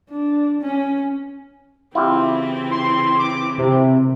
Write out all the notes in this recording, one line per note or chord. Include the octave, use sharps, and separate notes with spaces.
D4
C#4
C#3 E3 C4 E4 F4 G4
C6
D6
C3